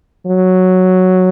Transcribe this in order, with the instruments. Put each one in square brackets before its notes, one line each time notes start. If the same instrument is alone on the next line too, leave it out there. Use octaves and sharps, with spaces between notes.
[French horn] F#3